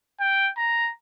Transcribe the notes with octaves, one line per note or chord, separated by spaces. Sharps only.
G5
A#5